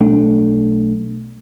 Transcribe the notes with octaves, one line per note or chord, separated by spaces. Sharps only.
B1 A3 D4